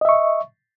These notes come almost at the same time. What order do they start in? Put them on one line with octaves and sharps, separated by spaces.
D#5 E5 C#6